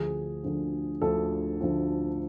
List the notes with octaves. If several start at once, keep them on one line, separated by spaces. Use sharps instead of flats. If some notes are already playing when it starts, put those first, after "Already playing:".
Already playing: D2 D3 F3 G#4
D2 D3 F3
D2 D3 F3 A4
D2 D3 F3